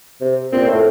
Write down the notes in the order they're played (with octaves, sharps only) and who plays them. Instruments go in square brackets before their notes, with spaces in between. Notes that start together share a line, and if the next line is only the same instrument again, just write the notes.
[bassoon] C3
[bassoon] A#2 [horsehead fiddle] C4
[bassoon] A2